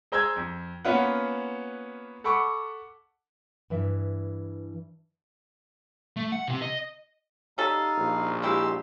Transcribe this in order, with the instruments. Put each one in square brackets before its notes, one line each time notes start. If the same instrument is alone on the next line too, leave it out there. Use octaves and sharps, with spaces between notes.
[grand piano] G#4 C5 A#5 E6 G6 G#6
F2
A#3 B3 C#4 F4 B4 F#5
A4 F#5 B5 C#6 D6
[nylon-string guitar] G2 E3 E5
[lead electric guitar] A3
F#5
C3 C4
D#5
[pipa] G3 C#4 A4 [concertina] D#4 F5
[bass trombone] A#1
[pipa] G3 E4 G4 [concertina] G#3 C6 E6